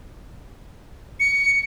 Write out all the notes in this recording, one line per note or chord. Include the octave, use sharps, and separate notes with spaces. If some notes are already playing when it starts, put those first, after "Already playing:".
C#7